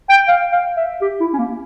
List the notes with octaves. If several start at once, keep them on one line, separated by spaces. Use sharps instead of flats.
G5
F5
F5
E5
G4
E4
C#4
A#3